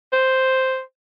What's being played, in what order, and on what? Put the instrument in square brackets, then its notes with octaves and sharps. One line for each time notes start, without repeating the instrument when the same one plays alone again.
[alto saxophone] C5